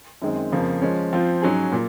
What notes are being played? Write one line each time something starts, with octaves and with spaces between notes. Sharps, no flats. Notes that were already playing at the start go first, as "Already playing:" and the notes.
F#2 D#3 G#3 C4
F2 C#3 F3 A#3
F3 G#3 C#4
F3 C4 F4
G#2 F#3 C#4 G#4
A#2